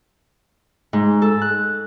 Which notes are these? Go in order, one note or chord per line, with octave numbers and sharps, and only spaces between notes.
G#2
A4
F#6